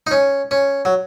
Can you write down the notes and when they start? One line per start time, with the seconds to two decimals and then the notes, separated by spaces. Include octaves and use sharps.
0.07 D#4
0.11 C#4
0.51 C#4
0.85 F#3